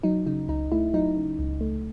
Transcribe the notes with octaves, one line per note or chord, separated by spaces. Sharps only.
F#3 D#4
C#3 D#4
C#2 D#4
A3 E4
F#3 D#4
C#3
C#2
A3